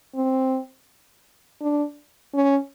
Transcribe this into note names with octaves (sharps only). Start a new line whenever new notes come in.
C4
D4
C#4